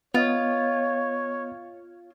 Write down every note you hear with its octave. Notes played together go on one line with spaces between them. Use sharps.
B3 F4 C#5 D#5